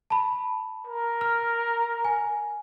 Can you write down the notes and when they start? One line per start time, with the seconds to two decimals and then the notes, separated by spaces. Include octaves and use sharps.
0.10 A5 B5
0.87 A#4
1.21 F6
2.05 G#5